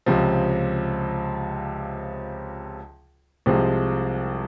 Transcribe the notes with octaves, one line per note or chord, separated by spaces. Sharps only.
C#2 C3 F3
C2 C3 F3 G#3